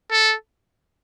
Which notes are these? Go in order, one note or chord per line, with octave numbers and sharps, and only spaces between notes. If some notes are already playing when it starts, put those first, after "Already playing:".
A4